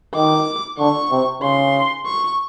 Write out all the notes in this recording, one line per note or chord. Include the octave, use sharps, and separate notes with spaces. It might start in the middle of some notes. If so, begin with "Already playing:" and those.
D#3 D6
D3 C#6
C3
C#3 C6
C#6